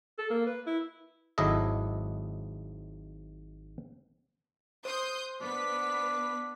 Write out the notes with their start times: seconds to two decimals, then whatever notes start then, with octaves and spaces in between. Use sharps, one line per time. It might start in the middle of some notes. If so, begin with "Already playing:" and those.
0.18 A4
0.30 A#3
0.47 B4
0.67 E4
1.38 G#1 G#2 F#3 E4 A4 D#5
4.85 C5 C6 D#6 G6
5.41 B3 D4 B4 B6